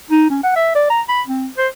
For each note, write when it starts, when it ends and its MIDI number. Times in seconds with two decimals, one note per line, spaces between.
0.10 0.29 63
0.30 0.42 61
0.43 0.51 78
0.56 0.72 76
0.75 0.85 74
0.90 1.01 82
1.08 1.21 83
1.27 1.47 60
1.58 1.67 72